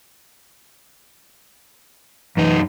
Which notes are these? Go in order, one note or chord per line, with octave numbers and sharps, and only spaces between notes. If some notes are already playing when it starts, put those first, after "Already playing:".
F#2 E3 D#4